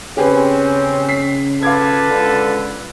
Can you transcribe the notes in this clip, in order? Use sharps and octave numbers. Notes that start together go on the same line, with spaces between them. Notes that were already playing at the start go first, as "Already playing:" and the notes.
C#3 C4 C#4 G4 G#4 B4
B6 C7
F4 A4 B4 F5 D6 G#6
C#2 D3